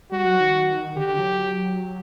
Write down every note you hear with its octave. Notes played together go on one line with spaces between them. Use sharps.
G3 F#4
F#3
D#3
D3 G4
F#3